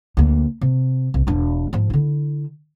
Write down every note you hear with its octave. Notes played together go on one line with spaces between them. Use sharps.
D2 A#3
C3
C2
E1 D4
G#2 F3
D3 E4